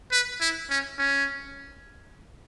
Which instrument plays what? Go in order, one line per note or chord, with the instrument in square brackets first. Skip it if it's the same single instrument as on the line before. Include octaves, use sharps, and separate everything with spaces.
[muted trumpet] B4
E4
C#4
C#4